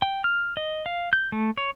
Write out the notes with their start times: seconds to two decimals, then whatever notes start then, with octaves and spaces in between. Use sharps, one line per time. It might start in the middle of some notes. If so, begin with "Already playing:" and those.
0.02 G5
0.24 F6
0.57 D#5
0.86 F5
1.13 G6
1.32 A3
1.57 C#5